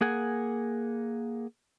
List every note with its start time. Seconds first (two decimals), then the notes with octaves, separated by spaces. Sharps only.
0.01 A#3 G#4 F#5 G#5